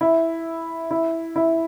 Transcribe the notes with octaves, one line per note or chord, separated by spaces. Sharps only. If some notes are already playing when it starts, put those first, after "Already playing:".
E4
E4
E4